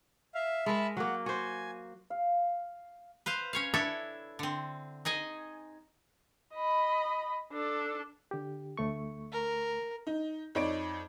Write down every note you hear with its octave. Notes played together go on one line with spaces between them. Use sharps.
E5 F5
G#3 A#4 E5 A5 B5
F#3 A#3 F#5
F#4 C5 G#5
F5
B4 C5 F5
C#4 C#5 F5
D4 E4 A4 C#5 E5
D3 C4
D#4 G#4 D#5 G#5
D#5 B5
D4 A4
D3 G4
D2 A3 C#6
A#4
D#4
F2 D#4 C#5 D5 D7